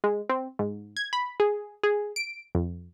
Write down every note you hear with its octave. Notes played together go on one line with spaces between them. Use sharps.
G#3
C4
G#2
G#6
B5
G#4
G#4
D7
F2